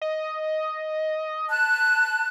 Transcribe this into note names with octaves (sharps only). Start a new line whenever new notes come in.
D#5
A5 F#6